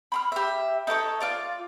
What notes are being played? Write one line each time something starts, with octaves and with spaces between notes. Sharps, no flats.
B5 C6 F6
G4 E5
D#4 A4 A#4 C#5
F4 D5 F5